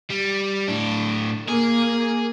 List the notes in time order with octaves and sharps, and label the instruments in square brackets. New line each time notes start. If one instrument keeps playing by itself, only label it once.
[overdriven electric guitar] G3
A2 D4
[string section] A#3 [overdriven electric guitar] G#4